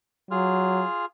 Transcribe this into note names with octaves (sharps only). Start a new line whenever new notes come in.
F#3 F4 G#4 F6